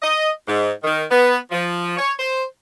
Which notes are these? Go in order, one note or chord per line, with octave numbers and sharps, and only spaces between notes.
D#5
G#2
D#3
B3
F3
C#5
C5